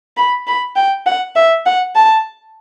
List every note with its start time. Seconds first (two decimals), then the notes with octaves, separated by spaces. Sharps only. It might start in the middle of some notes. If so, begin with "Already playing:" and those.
0.17 B5
0.47 B5
0.76 G5
1.06 F#5
1.36 E5
1.66 F#5
1.96 A5